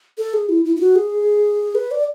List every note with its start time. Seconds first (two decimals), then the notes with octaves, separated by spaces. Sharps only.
0.18 A4
0.34 G#4
0.49 E4
0.65 E4
0.76 E4
0.81 F#4
0.96 G#4
1.75 B4
1.91 D5